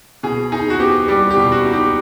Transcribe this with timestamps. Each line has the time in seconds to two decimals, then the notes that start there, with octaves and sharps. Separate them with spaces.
0.23 B2 G#4
0.52 D#4 G#4
0.70 F#4
0.80 B3 G4
1.08 G3 G4
1.31 G4
1.37 B2
1.52 F#4
1.65 D#4
1.73 G4